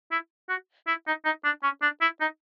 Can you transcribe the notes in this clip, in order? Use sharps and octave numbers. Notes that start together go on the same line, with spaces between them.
E4
F#4
E4
D#4
D#4
D4
C#4
D4
E4
D#4